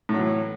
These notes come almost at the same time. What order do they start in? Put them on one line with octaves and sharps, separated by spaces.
A2 F#3 E3